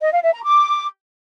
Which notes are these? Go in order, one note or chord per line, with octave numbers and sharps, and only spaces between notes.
D#5
F5
E5
A#5
D6